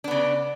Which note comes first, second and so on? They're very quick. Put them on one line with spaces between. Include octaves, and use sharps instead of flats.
D4 B3 C#3